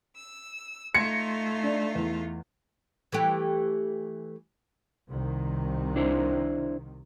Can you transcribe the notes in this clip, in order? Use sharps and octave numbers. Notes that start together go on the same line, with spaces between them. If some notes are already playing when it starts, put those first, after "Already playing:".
E6
A3 D#4 F4 C6 G#6 A#6 C#7
D4
E2
E3 A3 G4
C2 C3 D#3
D4 E4 C5